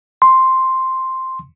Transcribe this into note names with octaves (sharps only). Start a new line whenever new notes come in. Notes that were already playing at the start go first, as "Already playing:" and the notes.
C6